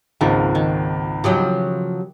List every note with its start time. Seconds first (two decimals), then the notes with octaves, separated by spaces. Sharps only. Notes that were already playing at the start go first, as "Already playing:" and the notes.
0.21 G#1 C#2 C#3 F3 A#3
0.55 D#3
1.24 C#3 F3 F#3 G4